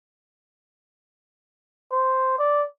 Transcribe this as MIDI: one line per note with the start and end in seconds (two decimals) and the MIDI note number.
1.91 2.38 72
2.38 2.63 74